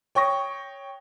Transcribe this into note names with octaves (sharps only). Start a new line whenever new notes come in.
C#5 G5 C#6 D#6 A#6